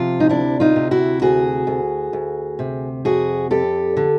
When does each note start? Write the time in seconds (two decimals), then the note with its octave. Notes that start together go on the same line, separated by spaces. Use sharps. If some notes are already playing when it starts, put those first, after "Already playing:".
Already playing: C3 F3 F4
0.20 D#4
0.29 D2 D4 E4
0.60 D#4 F4
0.76 C3
0.91 E4 F#4
1.22 D2 F#4 G#4
1.67 D2
2.13 D2
2.59 C3
3.05 F2 F#4 G#4
3.51 F2 G4 A4
3.97 D3